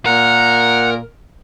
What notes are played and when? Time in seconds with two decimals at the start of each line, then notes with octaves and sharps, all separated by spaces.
0.06 A#2 A#4 F#5